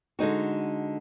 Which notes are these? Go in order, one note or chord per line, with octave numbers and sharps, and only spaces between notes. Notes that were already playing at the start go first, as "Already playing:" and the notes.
D3 G#3 D#4 F#4